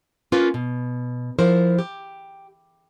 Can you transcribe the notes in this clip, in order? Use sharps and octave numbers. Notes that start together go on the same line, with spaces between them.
A#3 C#4 F4 A#4 B4
B2
F3 E4 A#4 C5
G4